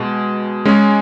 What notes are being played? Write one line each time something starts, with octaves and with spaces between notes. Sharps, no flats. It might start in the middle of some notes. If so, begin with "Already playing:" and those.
Already playing: B2 G#3
G#3 C#4 G#4